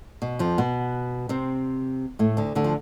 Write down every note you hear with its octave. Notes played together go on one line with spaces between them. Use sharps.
B2
F2 F3
B2 B3
C3 C4
A2 A3
D2 D3
D2 D3
F3